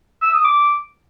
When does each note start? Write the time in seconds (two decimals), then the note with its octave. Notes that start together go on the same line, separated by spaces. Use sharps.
0.22 E6
0.33 D#6
0.44 D6